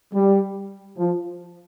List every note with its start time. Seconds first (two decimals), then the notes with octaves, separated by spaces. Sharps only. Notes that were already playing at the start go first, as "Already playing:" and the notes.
0.14 G3
0.98 F3